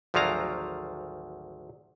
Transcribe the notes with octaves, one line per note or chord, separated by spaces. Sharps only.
G#1 D2 F3 F#3 F5 A#5